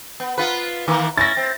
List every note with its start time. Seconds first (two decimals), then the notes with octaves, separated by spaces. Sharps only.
0.20 B3
0.38 B3 F4 B4
0.88 D#3 E3 A#3
1.18 C#4 E4 A6 A#6
1.37 C4